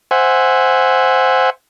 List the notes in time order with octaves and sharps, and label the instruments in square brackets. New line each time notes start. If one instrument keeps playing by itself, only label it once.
[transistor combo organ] C5 E5 F#5 G#5